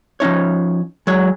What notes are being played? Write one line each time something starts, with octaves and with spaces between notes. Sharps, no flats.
F3 C#4 D#4 C#5
F#3 G#3 C#5